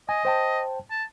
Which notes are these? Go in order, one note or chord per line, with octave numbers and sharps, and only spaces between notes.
D#5 G#5
C5 G5 A5
A5